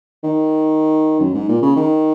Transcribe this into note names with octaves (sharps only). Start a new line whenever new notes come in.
D#3
F#2
G#2
A#2
C#3
D#3